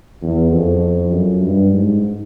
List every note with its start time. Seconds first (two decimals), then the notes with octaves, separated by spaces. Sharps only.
0.22 E2
0.52 F2
1.12 F#2
1.43 G2
1.72 G#2